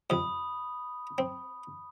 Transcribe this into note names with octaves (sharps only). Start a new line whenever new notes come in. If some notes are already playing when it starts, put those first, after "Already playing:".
F2 C3 B5 D#6
C4